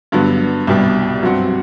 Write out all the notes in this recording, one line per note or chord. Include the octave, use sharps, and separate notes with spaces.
G2 D3 F#3 B3
C2 B2 G3
G2 F#3 C4 F#4